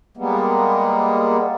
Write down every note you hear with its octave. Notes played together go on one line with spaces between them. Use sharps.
G3 G#3 A#3 B3